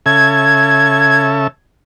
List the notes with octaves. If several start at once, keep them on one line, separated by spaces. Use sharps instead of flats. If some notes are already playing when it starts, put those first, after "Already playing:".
C#3 A4 E5 G#6